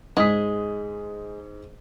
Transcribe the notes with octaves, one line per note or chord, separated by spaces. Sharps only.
G#2 G#3 G#4 D#6 B6